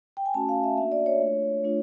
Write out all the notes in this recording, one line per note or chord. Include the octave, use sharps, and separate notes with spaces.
G5
G#5
A3 C#4 F#4 A5
F5
E5
A#3 D4 F#4 E5
D5
C#5
A3 D4 F4
A3 D4 F4